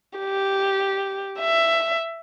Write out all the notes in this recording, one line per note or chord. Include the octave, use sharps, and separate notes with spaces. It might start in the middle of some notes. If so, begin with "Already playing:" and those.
G4
E5